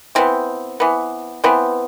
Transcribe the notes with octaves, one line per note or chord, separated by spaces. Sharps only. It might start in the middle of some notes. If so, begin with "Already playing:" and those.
E3 B3 C4
E3 B3
E3 B3 C4